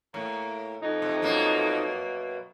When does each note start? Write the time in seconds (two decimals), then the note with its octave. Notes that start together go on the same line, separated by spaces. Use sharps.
0.14 A2 A#3
0.82 F2 D#4
1.02 C3
1.22 F#2 B2 A#3